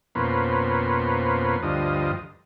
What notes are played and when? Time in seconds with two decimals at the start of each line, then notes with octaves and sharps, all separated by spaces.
0.15 F2 B2 A#3 C#4 B4 C5
1.63 D2 G2 F3 D#5